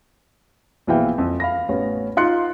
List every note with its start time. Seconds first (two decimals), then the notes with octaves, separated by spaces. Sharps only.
0.87 A#1 B2 E3 E4 F5 G5
1.18 F2
1.40 F5 B5 A#6
1.69 A1 B3 C#4
2.17 D#4 F4 C6 F#6 C#7